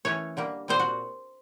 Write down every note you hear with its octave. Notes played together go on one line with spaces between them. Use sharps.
E3 A3 C#4 C#5
D3 G3 A#3
A#2 G3 C4 C5
F#4